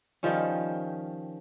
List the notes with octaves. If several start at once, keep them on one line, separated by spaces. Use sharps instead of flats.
D#3 F3 G3 C#4